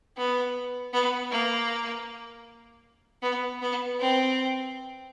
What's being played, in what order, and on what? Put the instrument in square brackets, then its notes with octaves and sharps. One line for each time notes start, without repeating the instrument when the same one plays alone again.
[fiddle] B3
B3
A#3
B3
B3
C4